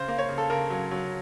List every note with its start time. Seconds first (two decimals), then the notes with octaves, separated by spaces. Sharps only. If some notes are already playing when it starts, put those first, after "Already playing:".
Already playing: C#3 C5
0.08 A#3
0.18 C#5
0.29 C#3
0.38 A4
0.50 C#3 A#4
0.70 F#3
0.91 F#3